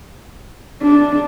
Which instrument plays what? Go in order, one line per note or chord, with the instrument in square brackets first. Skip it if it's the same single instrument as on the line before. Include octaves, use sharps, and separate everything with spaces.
[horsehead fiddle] D4